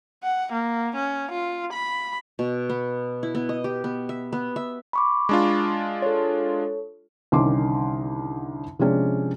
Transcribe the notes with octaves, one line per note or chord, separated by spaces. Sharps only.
F#5
A#3
C#4
F4
B5
B2
B3
E4
B3
D#5
G4
B3
E5
B3
E5
B5 C#6 D6
G#3 D4 F4
A4 C#5
C2 D3 D#3 C#4 C6 D6
C3 F3 G#3 C#4 D4